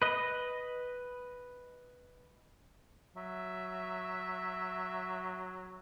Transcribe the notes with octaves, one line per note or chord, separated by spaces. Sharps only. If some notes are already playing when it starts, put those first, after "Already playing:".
B4 D#5
F#3 E5